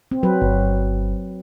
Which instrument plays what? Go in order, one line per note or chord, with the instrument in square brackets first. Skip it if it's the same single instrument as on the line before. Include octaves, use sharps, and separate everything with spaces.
[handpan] C4
F#3 B4
[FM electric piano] G1